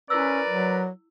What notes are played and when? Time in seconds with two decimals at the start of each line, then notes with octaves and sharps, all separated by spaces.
0.10 C#4 E4 A#4 B4 D5 E6
0.49 F#3